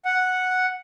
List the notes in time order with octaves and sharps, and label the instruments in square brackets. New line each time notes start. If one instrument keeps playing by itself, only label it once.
[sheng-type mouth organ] F#5